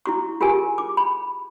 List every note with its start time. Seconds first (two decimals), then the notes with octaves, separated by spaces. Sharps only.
0.06 E4 F#4 C#6
0.41 F4 G4 G#4 A#4 G#5
0.78 D6
0.97 B5